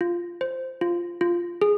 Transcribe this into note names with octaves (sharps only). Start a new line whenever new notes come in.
F4
C5
F4
F4
G#4